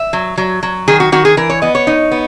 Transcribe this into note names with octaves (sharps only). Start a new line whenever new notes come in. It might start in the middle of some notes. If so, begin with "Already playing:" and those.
Already playing: E5
F#3
F#3
F#3
D#3 G#4
F#4
D#3 F#4
G#4
E3 A#4
C#5
B3 D#5
C#5
D#4
B3